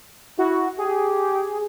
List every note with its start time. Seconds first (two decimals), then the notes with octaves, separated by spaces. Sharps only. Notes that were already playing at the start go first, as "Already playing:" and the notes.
0.38 E4 F#4
0.78 G4 G#4